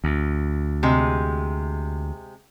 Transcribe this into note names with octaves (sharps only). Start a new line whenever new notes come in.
D2
C3 G#3